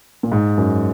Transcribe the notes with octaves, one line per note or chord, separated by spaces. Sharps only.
A#2
G#2
F#2